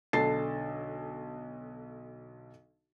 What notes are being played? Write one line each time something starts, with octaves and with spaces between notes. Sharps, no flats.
B1 D3 A4 A5 A6 C7